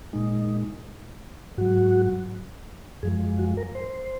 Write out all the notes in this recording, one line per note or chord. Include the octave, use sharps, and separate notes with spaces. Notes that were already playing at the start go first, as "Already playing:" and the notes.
A#2 G#3 D#4
G#2 F#3 F#4
F#2 F3 G#3 G#4
F#4
A#4
C5